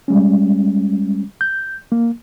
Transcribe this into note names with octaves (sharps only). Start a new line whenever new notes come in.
G3 G#3 C#4
G6
A#3